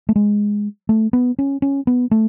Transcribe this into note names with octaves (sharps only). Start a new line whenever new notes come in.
A3
G#3
A3
B3
C#4
C#4
B3
A3